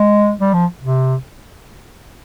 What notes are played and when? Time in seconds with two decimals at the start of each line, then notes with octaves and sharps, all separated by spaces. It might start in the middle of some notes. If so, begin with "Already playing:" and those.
Already playing: G#3
0.41 G3
0.54 F3
0.80 C3